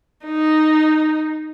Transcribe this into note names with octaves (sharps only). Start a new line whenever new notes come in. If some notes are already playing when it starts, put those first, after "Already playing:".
D#4